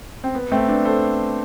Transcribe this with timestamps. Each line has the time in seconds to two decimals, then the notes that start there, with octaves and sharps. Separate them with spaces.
0.24 C4
0.35 B3
0.52 A3 C4
0.68 B3 D4
0.85 A4 C5